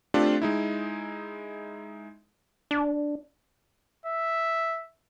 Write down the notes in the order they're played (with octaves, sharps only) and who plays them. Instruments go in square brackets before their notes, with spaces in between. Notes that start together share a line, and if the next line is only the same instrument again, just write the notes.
[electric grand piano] A3 C4 D4 F4 G4
G#3 D#4 E4
[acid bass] D4
[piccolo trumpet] E5